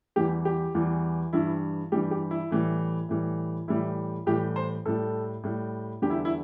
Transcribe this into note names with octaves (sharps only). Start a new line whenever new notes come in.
E2 E3 G3 G4
G4
E2 E3 G3
G2 E3 G3 E4
G2 E3 G3 G4
G4
E4
A2 E3 G3
A2 E3 G3
A2 E3 G3 E4
A2 E3 G3 G4
C5
A2 G3 A4
A2 G3
E2 D3 G3 G4
E4
E4